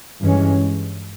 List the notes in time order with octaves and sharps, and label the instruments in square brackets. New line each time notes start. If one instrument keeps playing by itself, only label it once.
[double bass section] G2 E3 G#3 C#4